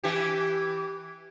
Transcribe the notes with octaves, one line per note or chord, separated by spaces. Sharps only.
E3 G4